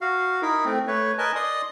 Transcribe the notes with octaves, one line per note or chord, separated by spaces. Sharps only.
F#4 F5
D#4 E4 A#4
A3 C4
A3 B4 C#5
A#4 B4 D#5 G#5 A5
D5 D#5 C6 D#6